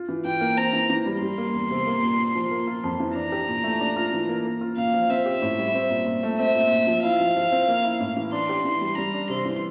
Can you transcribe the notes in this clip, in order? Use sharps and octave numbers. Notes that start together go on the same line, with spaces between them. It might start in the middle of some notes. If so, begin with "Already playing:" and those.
Already playing: F4
E3
E3 G5
A#3
C4 A#5
E3
E3
G3
G3 C6
A#3
E2
C3
A#3
A#2
A#2
F3
A#3
F4
F2
E3
D4 A#5
G4
A#2
A3
D4
F4
E3
A#3
A#3
F4
A#2 F5
F3
C4 E5
G4
A2
G3
C4
A#2
A#2
A3
C4 E5
A#2
A#2
F3
E4 F5
F3
F3
C4
A#3
E4
A2
E3
D4 C6
G4
E3
G3
G3 A#5
D4
C3 C6
E3